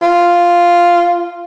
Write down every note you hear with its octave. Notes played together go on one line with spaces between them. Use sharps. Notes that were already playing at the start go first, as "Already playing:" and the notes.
F4